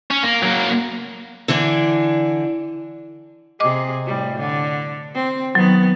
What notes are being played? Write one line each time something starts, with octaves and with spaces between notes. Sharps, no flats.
C#4
A#3
F#3 A#3
D3 E3 D4
C3 G#4 D#5 D6
A2 G3
D3
C4
D#3 F#3 B3